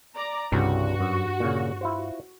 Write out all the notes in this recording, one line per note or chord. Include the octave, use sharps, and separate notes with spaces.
D5 A#5
C2 G2 C#3 F#4
F#2
A#2 C#3
E4 F4 C5